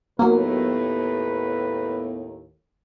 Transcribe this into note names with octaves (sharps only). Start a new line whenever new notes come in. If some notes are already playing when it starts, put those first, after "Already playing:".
D#2 A2 F#3 A#3 B3 B4